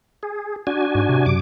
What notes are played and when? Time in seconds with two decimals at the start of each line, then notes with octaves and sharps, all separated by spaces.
0.23 G#4
0.67 D4 F#4 G#5
0.95 G#2
1.09 C3
1.26 F#2 D6